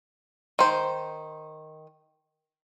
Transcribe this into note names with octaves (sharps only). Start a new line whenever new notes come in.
D#3 C5